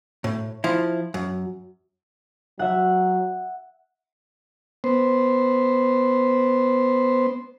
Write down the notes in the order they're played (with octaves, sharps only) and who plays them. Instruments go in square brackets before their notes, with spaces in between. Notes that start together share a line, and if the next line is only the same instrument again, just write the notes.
[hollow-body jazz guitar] A2
F3 E4
F#2
[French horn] F#3 [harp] E5 F#5
[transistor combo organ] B3 C5